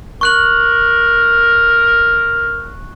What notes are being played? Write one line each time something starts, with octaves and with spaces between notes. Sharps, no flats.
A#4 C#6 F#6 F#7